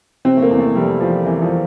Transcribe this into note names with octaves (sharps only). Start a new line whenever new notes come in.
C3 C4
A3
A#3
E2
A3
F1 G3
E3 F3
C3 E3
F3